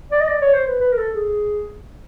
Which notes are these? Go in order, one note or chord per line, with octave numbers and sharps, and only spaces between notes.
D5
D#5
D5
C#5
C5
B4
B4
A#4
A4
G#4